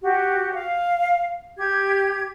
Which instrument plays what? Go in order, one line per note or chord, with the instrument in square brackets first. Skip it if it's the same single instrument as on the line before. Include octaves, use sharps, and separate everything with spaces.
[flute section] F#4 G4
F5
G4 G#6